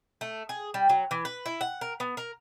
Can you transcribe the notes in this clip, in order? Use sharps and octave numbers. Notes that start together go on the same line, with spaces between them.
A3
G#4
G3
F#3
E3
B4
E4
F#5
A#4
B3
A#4